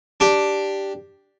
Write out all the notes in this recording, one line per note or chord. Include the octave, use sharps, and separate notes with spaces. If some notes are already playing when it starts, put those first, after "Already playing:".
D4 G4